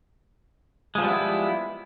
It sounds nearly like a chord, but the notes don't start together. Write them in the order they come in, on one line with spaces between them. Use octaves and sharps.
G#3 F3 G3 B3 E4